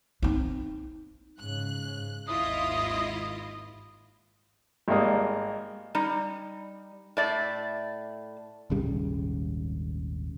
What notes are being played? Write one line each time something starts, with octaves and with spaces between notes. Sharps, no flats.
C4 D#4
G#2 C#3 F#6
G#1 D#2 G#2 E4 F4 D#5 D#6
G#1 G3 A#3 D#6
G3 D#4
A2 D5 E5
D#1 G#1 C#3 G3